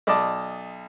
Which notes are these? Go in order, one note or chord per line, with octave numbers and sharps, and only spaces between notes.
B1 D5 D#5 A5 D6